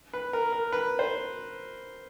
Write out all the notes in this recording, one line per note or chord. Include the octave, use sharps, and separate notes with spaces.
B4
A#4
A#4
B4
C5